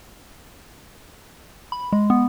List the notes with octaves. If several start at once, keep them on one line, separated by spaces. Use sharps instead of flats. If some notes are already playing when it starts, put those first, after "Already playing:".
B5
G#3
B3